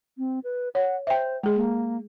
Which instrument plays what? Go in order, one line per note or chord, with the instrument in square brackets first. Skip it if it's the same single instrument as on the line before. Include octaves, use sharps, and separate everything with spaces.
[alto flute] C4
B4
[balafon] C#5 [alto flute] F#5
[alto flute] C5 [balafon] E5 G5
[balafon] G#3 G#4
[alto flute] A#3